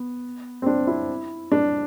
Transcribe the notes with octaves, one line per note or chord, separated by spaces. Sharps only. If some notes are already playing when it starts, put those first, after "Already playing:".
Already playing: B3
C4
D4
E4
D4